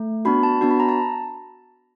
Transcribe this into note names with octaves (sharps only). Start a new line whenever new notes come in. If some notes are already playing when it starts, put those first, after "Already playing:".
Already playing: A3
B3 D4 F#4 B5
A5
B3 D4 F#4 A5
B5
A#5
A5